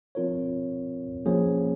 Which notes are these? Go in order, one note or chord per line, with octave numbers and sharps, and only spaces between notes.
F3 C4 F4 A#4 C#5
F3 A#3 C#4 G#4 C#5